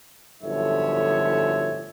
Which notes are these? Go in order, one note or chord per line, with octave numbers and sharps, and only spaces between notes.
G1 F#2 A2 F3 C#5 E5